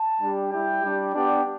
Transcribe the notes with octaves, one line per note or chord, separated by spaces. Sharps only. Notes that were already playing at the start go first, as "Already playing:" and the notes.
Already playing: A5
G3 D4 G4
G3 E4 G4 G5
G3 D4 G4
B3 D4 G4 D5